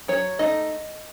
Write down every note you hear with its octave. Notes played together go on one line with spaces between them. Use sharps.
F#3 C#5
A3 D#4 D#5